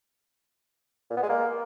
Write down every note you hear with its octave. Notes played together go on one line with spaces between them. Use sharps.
A#2
B3
G#3
A#3